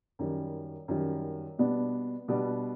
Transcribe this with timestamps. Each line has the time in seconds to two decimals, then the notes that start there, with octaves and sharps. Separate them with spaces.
0.19 F#2 D#3 G3
0.88 F#2 D#3 G3
1.59 B2 G3 B3 D4
2.28 B2 G3 B3 D4